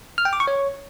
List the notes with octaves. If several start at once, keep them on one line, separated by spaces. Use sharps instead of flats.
F6
G5
D6
C#6
C#5